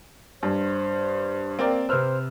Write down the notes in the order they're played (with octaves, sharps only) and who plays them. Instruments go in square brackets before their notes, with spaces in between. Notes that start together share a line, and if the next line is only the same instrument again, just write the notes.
[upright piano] G2 [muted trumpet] C5
[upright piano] A#3 A#4 G5 [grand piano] C4 D5
[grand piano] C3 B4 [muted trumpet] C5 [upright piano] E6 F6